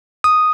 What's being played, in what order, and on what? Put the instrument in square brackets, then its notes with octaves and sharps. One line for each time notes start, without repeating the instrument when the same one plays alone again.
[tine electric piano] D#6